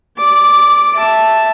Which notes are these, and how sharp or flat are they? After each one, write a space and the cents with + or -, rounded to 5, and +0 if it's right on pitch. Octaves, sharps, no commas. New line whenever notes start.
D5 -20 D6 +0
E5 +0 A5 +0